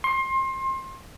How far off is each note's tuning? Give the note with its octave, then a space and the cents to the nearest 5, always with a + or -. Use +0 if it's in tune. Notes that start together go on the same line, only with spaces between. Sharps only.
C6 +30